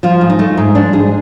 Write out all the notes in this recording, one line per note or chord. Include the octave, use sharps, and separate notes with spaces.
F3 F4
G#2
D#4
A3
G#2
F3 D4
G#2 G#4